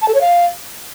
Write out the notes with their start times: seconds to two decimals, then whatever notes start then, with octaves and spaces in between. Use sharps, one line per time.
0.02 A5
0.08 A4
0.15 C#5
0.21 F5